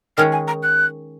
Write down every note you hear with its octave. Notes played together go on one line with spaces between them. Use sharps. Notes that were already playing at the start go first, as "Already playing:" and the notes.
D#3 G#3 C#4 F6
G#5
A#5
F#6